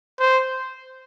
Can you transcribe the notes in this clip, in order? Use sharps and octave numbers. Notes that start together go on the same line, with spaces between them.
C5